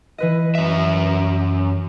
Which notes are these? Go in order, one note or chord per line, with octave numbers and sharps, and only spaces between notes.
E3 B4 D#5
F#2 E5